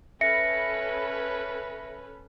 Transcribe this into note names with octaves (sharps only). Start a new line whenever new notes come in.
C#4 A4 B4 E5 A#6 C#7